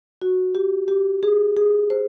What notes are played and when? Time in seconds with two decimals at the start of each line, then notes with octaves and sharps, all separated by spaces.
0.22 F#4
0.55 G4
0.88 G4
1.23 G#4
1.57 G#4
1.90 C5